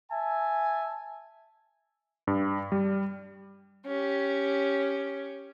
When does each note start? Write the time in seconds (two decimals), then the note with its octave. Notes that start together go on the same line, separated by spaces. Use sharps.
0.12 E5 G#5 A5
2.27 G2
2.72 G3
3.86 C#4 G4